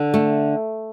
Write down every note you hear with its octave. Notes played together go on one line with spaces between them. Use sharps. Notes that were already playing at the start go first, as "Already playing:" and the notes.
Already playing: D3
A3